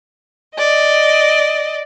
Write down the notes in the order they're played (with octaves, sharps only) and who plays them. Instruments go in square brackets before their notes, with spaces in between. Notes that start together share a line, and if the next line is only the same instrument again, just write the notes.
[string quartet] D5 D#5